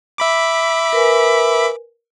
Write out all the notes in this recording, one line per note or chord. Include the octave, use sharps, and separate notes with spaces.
E5 B5 D6
A#4 B4 G#5